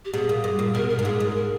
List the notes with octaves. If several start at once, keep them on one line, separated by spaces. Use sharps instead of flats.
G4
B2 G#4
A#2
G2
A#2
B2 A#4
A#4
G#2
A#4
A#2 G#4
G#2
A#4